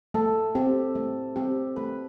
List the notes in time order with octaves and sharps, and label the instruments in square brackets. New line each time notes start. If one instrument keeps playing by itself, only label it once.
[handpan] A3 [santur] A4
[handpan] C4 G4
A3
C4 G4
[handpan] A3 [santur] B4